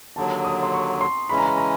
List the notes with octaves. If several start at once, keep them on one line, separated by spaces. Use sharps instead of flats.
D#2 D3 F#3 A5
D#6
C6
C#6
C6
C#3 E3 G#3 C#4 B5
A#5
B5
A#5